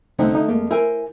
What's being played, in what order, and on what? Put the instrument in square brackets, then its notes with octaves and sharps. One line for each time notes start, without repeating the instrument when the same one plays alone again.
[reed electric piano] C2 C4 D#4 [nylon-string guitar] D3 A3 C#4
[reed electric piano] D#4
[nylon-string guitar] F2 [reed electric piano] G#3 A#3
[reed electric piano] E4 [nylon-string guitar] A#4 C5 G#5